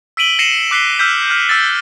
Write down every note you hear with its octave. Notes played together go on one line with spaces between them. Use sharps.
E6 B6 D7 D#7 F#7 G7
A#6 C7 C#7 D#7 E7 F#7
D6 F#6 B6 C7 G7
E6 F6 G6 B6
F6 G6
E6 A6